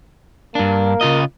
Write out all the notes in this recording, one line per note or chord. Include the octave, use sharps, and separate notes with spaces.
G2 A#3 D4
C#3 F4 D#5